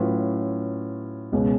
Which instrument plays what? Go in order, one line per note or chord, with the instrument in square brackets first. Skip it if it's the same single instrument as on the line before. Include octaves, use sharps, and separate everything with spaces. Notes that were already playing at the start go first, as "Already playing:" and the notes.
Already playing: [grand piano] A2 F#3 C#4 F4 B4
C#2 B2 G#3 C#4